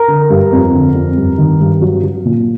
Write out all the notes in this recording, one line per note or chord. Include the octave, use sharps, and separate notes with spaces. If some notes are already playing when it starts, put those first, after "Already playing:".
Already playing: A#4 A#5
D3
G2
F2
D3
F2
G2
D#3
G2
F#3
F#3
A#2